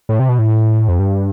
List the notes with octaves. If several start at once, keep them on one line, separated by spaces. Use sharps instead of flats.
A2
C3
B2
A2
F2
G2